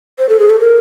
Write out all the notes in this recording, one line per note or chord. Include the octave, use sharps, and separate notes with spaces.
C5
A4
G#4
A4
A#4